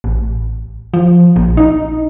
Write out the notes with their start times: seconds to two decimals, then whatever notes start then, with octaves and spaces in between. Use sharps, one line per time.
0.04 A1
0.94 F3
1.36 A#1
1.57 D#4